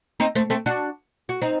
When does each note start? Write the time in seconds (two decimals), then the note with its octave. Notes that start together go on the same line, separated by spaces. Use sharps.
0.20 C4 D#4
0.35 A3 C4
0.50 A3 C4
0.66 D4 F#4
1.29 F#4
1.42 C4 D#4